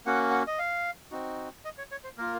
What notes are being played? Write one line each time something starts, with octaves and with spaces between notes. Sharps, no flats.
A#3 C#4 F#4 F#5
F#5
D#5
F5
C4 D#4 F#4
D#5
C#5
C#5
C5
A#3 F4 A#4